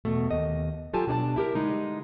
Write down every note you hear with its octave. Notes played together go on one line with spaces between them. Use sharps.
E2 B2 A3
D#2 D#5
F#3 F4 G4 A4 G#5 A5
B2 D4 D5 A5
E4 G4 A#4
D3 G#3 D#4